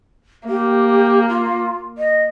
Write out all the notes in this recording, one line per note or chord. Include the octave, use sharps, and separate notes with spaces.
A#3 G4
F4
D#5